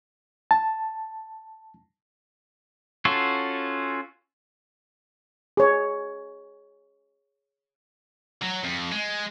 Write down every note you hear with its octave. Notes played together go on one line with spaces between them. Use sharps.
A5
C#4 F4 F#4 A4
G#4 C#5
F#3
F2
G#3